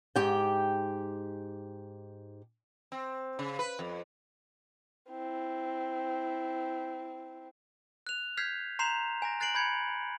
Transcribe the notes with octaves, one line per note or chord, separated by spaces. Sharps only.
G#2 G4 G5
C4
C#3
B4
F2
C4 E4
F#6 F7
F6 G6 G#6 B6 C7
A#5 C6 G6 C7 E7 F7
G#5 A#5 A#6
F#6 A6 C7 D7 F#7
B5 G6 G#6 C#7